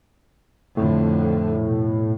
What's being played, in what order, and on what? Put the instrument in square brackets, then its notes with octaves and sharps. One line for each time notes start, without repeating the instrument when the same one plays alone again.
[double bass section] F2 D3 [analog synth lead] A2
[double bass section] B2